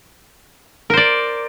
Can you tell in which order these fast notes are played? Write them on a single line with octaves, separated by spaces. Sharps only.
A#4 C5 D5